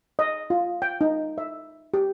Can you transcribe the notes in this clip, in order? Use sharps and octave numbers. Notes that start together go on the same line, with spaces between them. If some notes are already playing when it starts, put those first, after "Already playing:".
D#5
F4
G5
D#4
E5
G4